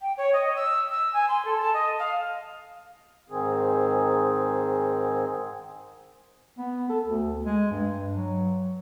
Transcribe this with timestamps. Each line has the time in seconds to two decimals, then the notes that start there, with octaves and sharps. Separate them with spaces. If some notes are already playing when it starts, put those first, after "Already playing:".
0.01 G5
0.18 C#5
0.33 D#5
0.56 E6
0.91 E6
1.14 G#5
1.28 C6
1.45 A4
1.61 A5
1.74 D#5
1.99 F5
3.30 G#2 D#3 C4 G#4
6.58 B3
6.89 A4
7.06 D2
7.44 G#3
7.71 G2
8.13 F#3